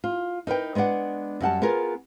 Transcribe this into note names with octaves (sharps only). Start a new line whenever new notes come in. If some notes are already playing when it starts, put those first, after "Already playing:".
F4
D#4 A#4 B4 G5
G#3 B3 D4 D5 F#5
F#2 G3 F#5 A5
B3 F4 G#4 A#4